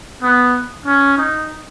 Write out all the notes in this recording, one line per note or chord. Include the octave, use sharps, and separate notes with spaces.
B3
C#4
D#4